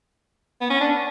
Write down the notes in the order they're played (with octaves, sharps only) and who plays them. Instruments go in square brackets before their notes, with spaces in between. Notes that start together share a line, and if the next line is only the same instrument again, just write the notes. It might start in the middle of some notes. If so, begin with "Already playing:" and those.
[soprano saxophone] B3
C#4
D4